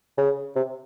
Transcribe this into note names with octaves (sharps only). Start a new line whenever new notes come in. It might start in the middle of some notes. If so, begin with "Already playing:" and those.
C#3
C3